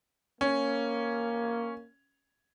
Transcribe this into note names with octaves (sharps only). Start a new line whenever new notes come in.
A#3 C#4